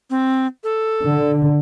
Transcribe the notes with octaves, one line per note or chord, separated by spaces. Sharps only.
C4
A4
D3